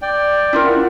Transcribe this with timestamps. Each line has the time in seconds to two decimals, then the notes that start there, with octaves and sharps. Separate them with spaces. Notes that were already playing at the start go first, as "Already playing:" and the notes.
0.02 D5 G5
0.53 E4 F4 A#4
0.66 F#5